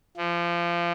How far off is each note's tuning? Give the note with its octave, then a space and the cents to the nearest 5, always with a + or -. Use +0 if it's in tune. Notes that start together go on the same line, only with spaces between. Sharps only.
F3 -25